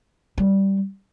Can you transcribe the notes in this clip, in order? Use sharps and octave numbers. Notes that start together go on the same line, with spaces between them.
G3